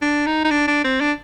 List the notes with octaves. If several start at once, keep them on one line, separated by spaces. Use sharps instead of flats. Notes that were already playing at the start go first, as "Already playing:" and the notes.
D4
D#4
D#4
D4
D4
C4
D4